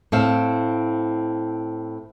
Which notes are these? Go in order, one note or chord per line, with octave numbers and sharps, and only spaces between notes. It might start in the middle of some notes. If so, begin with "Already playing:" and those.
A2 C4 E5 F5